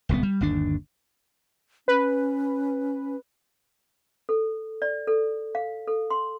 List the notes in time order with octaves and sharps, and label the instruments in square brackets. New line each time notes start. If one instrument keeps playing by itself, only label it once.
[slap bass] D1 C2 B2 B3
G3
G1 D#2 D4
[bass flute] C#4 [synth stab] B4
[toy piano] A4
D5
A4
F5
A4
C6